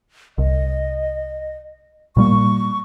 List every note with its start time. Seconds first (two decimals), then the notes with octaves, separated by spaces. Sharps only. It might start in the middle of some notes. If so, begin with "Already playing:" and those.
0.38 C2 D#5
2.17 A#2 G3 A#3 C#6